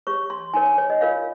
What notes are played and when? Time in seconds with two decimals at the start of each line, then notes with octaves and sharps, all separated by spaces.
0.07 G4 C#5 C#6
0.30 C6
0.54 D#4 A#4 C#5 G#5
0.66 G#5
0.78 C#5
0.90 D#5
1.01 F4 A#4 C#5 F5